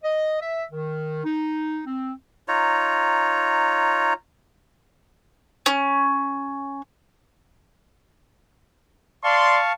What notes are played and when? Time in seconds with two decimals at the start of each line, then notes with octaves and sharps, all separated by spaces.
0.03 D#5
0.40 E5
0.72 D#3
1.24 D#4
1.86 C4
2.48 D#4 F4 C#5 A#5
5.66 C#4
9.24 D5 F5 A5 C6 C#6